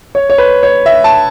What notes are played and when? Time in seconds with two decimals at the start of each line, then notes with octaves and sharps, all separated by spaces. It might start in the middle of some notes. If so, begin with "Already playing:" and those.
0.15 C#5
0.30 C#5
0.38 B4
0.63 C#5
0.86 E5
1.04 A5